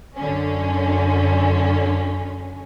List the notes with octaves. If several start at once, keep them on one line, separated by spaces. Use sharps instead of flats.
F#2 D3 C#4